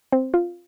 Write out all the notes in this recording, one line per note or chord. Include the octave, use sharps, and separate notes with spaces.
C4
F4